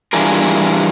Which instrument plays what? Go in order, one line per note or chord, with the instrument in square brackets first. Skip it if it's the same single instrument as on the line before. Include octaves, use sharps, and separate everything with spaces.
[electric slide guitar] E3 G3 D4 F4 G#4 A#4